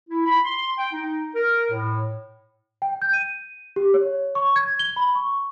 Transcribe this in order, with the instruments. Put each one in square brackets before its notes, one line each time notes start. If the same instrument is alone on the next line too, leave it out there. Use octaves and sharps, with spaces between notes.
[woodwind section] E4
B5
C6
G5
D#4
A#4
A2
[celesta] G5
G6
D#7
G4
C#5
C#6
G#6
G7
B5
C#6